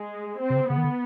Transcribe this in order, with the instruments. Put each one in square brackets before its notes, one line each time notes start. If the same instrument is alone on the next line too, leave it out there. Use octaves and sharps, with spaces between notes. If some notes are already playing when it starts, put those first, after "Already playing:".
Already playing: [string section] G#3
C4
[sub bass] C3
C#3
[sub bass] C#3 [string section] B3
[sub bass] D#3
D3